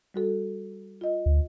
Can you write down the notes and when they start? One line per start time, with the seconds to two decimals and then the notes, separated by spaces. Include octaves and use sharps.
0.14 G3 F#4 A4
1.01 F4 D#5
1.26 D2